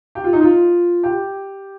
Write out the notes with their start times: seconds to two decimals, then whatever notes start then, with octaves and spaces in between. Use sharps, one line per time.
0.15 G4
0.24 F4
0.33 D#4
0.42 F4
1.03 G4